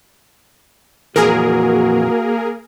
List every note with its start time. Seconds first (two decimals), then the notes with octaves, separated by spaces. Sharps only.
1.16 F2 A#2 E3 A#3 F#4 G#4 A#4